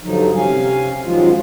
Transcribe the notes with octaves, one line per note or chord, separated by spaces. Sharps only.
G2 D3 F3 F#3 D#4
C3 C#4 F5 G#5
F#2 D#3 F3 F#3 G#3 F4